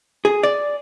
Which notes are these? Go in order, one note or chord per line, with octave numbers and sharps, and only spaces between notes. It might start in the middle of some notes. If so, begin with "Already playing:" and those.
G#4
D5